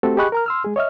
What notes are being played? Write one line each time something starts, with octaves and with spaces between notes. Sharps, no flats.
A3 C4 F#4 G4 A4
G4 G#4 D#5 B5 C#6 F#6
A#4 A#5 F6
C6 E6 F6
G#3 G#4
C#5 D#5 E5 F6